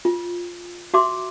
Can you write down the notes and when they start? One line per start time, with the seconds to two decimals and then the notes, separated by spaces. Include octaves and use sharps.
0.05 F4
0.94 F#4 E5 C6 D6